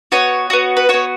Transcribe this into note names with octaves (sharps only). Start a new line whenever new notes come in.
B3 F#4 C#5
B3 F#4
B4
B3 F#4 C#5